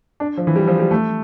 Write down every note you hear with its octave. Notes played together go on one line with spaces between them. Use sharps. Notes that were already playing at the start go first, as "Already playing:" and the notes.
D4
F3
E3
G3
F3
G3
A3